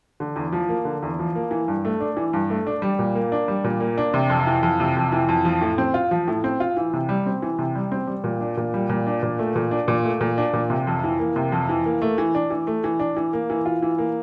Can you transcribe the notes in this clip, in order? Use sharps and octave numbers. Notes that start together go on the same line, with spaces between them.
D3
E2
F3
A#3
D3
E2
F3
A#3
E3
G2
A3
D4
E3
G2
A3
D4
G3
A#2
A#3
D4
G3
A#2
A#3
D4
C3
F2
E3
F2
C3
F2
E3
F2
F3
A2
C4
F4
F3
A2
C4
F4
E3
C3
G3
C4
E3
C3
G3
C4
G3
A#2
D4
A#2
G3
A#2
D4
A#2
A3
A#2
D4
A#2
A3
A#2
D4
A#2
C3
F2
E3
A#3
C3
F2
E3
A#3
A3
E3
D4
E3
A3
E3
D4
E3
A#3
E3
F4
E3
A#3